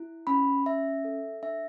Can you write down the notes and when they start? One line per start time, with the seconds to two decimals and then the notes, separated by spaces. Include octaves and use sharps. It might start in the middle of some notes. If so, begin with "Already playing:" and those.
Already playing: E4
0.27 C#4 B5
0.66 C#4 E5
1.05 A4
1.43 D4 E5